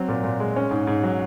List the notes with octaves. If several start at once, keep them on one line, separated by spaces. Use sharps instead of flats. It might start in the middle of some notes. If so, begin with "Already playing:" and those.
Already playing: F#3 C4
A#2
A#2
G#3
C#4
G#2
G#2
F#3